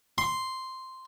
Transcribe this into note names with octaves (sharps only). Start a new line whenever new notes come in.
C6